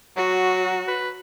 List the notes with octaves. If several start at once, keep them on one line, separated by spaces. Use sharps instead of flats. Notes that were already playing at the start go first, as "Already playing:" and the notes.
F#3 F#4
B4